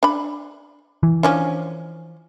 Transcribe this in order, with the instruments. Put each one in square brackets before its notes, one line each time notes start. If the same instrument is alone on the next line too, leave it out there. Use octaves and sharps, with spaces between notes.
[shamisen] D4 B5
[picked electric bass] E3
[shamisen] F3 C#4 D4